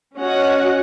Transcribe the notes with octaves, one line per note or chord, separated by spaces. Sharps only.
C#4 F#4 D#5 F#5